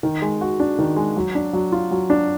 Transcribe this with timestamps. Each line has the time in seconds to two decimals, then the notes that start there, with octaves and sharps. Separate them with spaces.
0.03 D#3
0.22 G#3
0.41 F#4
0.60 D4
0.79 D#3
0.96 G#3
1.16 F#3
1.35 D4
1.53 F#3
1.72 F4
1.91 F#3
2.10 D4